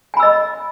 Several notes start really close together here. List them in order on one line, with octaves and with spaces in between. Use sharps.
G#5 B5 E6 D#5